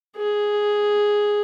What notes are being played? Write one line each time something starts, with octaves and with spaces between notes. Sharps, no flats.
G#4